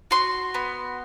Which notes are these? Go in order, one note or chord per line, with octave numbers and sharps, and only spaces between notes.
F#4 C6
B3